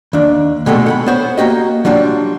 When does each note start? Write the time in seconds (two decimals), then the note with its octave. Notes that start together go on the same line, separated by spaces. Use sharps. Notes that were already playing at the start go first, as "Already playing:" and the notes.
0.13 D#2 D4
0.66 B2 G#3 A3 B3 G4 A4
0.86 F#5 G5 B5
1.06 B3 C5 C#5
1.37 A#3 F#4 G4 D#5
1.85 F#3 G3 D4 F4